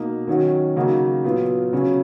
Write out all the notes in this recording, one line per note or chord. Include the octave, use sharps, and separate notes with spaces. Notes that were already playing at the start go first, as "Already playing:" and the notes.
Already playing: B2 A#3 D#4
D#3 F#3 C#4 F#4
C#3 F#3 A#3 D#4 F#4
A#2 F#3 B3 F4
C#3 F#3 C#4